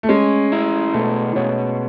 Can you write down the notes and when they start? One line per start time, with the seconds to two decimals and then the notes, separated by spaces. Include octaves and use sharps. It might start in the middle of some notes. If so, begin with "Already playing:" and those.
0.03 A3
0.09 G#3 C#4
0.52 E4
0.94 B2 A3
1.36 B2 C#4